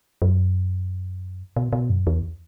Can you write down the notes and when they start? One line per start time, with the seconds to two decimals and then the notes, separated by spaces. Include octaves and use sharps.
0.22 F#2
1.56 B2
1.73 B2
1.90 F#2
2.07 E2